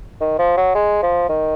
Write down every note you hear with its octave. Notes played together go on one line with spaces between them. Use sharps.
D#3
F3
F#3
G#3
F3
D#3